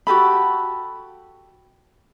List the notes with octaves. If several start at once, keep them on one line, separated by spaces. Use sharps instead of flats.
F#4 G4 A4 B5